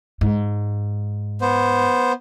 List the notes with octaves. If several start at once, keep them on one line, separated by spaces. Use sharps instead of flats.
G#2
B3 C5